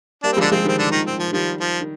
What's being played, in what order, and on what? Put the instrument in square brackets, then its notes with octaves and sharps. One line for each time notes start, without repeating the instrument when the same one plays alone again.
[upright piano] G3 A#3 [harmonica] D4
[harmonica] C4
[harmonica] D3 D4 [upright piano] F3 G#3
[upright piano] F3 G#3 [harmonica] C4
[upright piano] D#3 G3 [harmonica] C4
[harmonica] D3 D4
D#3 D#4
C4
F3
[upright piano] D#3 G3 [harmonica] F3
[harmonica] F3
[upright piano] D#3